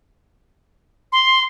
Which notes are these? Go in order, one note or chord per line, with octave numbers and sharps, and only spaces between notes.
C6